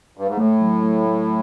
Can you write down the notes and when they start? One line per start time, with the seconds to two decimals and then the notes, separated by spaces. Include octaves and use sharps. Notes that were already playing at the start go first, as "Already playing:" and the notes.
0.17 G2
0.28 G#2
0.37 A2 A3
0.61 F#3
0.83 A3
1.06 A3